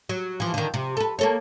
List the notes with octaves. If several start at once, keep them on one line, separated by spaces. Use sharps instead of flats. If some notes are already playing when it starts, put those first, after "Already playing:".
F#3
E3 F3
D3 D#3
C3
A4 B4
A#3 A4 C#5